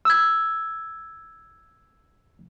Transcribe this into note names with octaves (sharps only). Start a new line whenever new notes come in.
E6 G#6